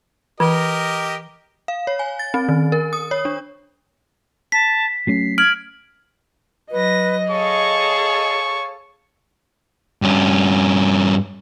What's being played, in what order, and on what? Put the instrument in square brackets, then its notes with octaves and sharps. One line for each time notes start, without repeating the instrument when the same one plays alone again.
[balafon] E3 [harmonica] G4 A#4 D#5
[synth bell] F5
C#5
G#5
A6
C4
D#3
A#4
D#6
C#5
D4
[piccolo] A5 [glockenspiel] B6
[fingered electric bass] F#3 A3 C#4 [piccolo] C7
[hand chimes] F6 [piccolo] G#6 [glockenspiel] D7 F#7
[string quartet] F#3 A#6 [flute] B4 [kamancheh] D#5
[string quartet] G#4 A4 F5 [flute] C#5 [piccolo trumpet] C#6
[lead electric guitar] G2 C#4